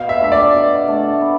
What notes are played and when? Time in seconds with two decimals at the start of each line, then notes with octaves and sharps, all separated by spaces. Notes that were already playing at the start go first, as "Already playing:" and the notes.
Already playing: B2 F5
0.09 E5
0.21 A3 D4 A4 E5
0.32 D5
0.54 B2
0.88 A3 D4 A4
1.21 B3